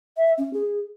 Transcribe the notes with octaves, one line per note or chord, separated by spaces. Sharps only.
E5
C#4
G#4